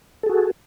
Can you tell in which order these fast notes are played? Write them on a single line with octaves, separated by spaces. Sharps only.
A4 G#4 F#4